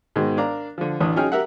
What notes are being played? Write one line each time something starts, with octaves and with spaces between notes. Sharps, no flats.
G#2 B2 D#3 G#3
D4 A#4 D5 F5 A#5
D3 F3
A1 E3 D4 D#6
F#3 C#4 D#4 G#4 G5 F6
G4 A#4 E5 F#5